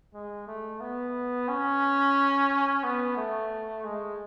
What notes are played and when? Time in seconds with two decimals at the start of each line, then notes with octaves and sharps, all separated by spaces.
0.14 G#3
0.47 A3
0.80 B3
1.48 C#4
2.83 B3
3.17 A3
3.84 G#3